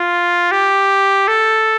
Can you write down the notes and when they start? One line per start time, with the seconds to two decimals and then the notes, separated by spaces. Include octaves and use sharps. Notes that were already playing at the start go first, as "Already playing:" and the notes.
Already playing: F4
0.51 G4
1.28 A4